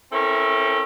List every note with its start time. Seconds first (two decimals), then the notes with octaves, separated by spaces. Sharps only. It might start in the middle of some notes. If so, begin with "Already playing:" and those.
0.12 C4 C#4 E4 A4 A#4